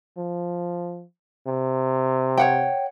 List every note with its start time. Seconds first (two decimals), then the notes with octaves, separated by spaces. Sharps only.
0.17 F3
1.47 C3
2.37 C#5 F#5 G5